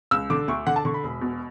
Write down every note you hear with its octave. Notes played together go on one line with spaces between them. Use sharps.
C#2 E6
D3 D6
D2 C#6
D3 F#5
A5
D3 C#6
B5
E1
B2